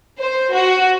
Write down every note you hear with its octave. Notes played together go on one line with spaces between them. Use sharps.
C5
F#4